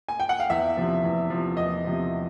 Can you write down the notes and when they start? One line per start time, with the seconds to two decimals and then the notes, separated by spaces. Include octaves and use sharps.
0.08 G#5
0.20 G5
0.29 F#5
0.40 F5
0.50 E2 E5
0.77 C3 F3
1.04 E2
1.30 C3 F3
1.57 E2 D#5
1.84 C3 F3